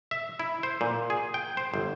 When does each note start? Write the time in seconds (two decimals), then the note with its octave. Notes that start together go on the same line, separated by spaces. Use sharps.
0.11 E5
0.39 E4
0.63 C5
0.81 A#2
1.10 G#4
1.34 G5
1.57 C5
1.74 G1